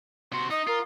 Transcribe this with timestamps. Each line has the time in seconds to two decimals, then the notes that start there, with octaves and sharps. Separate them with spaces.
0.32 C3 F#4 C6
0.50 D#4 D#5 D#6
0.67 F4 A#4